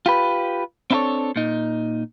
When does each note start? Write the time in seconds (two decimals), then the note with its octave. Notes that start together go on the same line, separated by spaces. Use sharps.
0.06 F4 G4 B4
0.91 C4 D4 E4 G4 A4 C#5
1.36 A#2 D#4